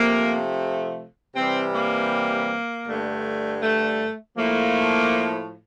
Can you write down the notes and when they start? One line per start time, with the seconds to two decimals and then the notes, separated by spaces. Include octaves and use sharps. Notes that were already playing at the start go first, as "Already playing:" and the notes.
Already playing: C3 F3 A3 A#3
1.35 C3 E3 G3 C4
1.73 A#3
2.86 G2 D3 A3
3.62 A3
4.36 A2 F3 A3 A#3